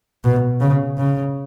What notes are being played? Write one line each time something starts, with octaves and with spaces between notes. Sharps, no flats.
B2
C#3
C#3